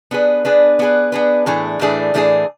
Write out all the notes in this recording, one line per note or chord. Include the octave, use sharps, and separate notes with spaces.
B3 D4 G#4 B4
B3 D4 G#4 B4
B3 D4 G#4 B4
B3 D4 G#4 B4
A2 E3 A3 D4 G#4
A2 E3 A3 D4 G#4
A2 E3 A3 D4 G#4